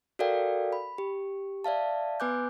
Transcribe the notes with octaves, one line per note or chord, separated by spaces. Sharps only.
F#4 A4 A#4 D5 F5 G5
B5
G4
D5 E5 F5 A5
B3 B4 G#5 D6 F#6 G6